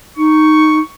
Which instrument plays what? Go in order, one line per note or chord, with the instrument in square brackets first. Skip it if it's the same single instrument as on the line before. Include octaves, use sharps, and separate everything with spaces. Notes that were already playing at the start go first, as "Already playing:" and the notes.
[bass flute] D#4 [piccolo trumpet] C#6